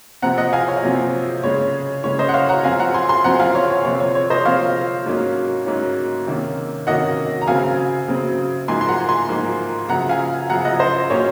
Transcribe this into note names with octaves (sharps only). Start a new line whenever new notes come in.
C3 F3 C4 F#5 A#5
D#5 F#5
F5 G#5
C#5
C3 F3 C4
C#3 G#3 C#4 C#5
C#3 G#3 C#4 C#5
C5 D#5
F#5
C#5 F5
F#5 A#5
F#2 F3 C4 F5 G#5
F#5 A#5
G#5 C6
G#5 C6
F#2 F3 C4 F#5 A#5
F5 G#5
C#5
C#5
C3 F3 C4 C#5
C#5
C#5
C5 D#5
C3 F3 C4 C#5 F5
G#2 F#3 A#3 C#4
G#2 F#3 A#3 C#4
C3 D#3 A#3 C#4
C3 D#3 A#3 C#4 D#5 F#5
A#5
F#2 C#3 F#3 C4 F5 G#5
F#2 C#3 F#3 C4
G#2 F3 A#3 G#5 C6
C6
F#5 A#5
G#5 C6
G#2 F3 A#3
F#2 C#3 F3 F#5 A#5
F5 G#5
F#2 C#3 F3 F#5 A#5
D#5 F#5
C5 D#5
A#2 F#3 A#3 C#4 C#5